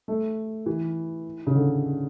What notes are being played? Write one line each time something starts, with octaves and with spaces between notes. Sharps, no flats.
A3
E3
C#3
D3